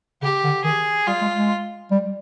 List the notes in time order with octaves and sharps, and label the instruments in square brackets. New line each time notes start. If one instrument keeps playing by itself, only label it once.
[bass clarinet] C#3 [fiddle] G4
[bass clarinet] D3
[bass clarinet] D#3 [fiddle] G#4
[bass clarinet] G3 [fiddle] F4
[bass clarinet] G#3
G#3
G3